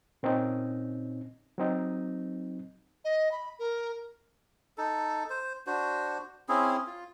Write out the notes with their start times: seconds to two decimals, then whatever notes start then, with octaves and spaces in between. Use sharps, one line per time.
0.23 A#2 C4 C#4 D#4
1.58 F#3 C4 D#4
3.05 D#5
3.32 B5
3.59 A#4
4.78 D#4 A4
5.30 C5
5.67 D4 F#4 C5
6.49 C4 C#4 E4 G#4
6.87 F4